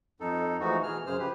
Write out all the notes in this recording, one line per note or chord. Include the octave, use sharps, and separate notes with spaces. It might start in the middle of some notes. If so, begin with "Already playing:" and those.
F2 D#4 A4
E3 F3 G#3 A3 D#4 F#4
B2 E3 G#4 F6
F#2 C#3 G#4 C5 F6
F3 G4 B4